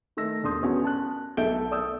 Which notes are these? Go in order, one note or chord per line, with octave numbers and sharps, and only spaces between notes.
D#3 A3 E6 A#6
E1 D4 A4 C6 D#6 G6
B3 C#4 F#4
A5 F#6
B1 A4 E5 G6 D7 G7
D5 D#6 E6 G6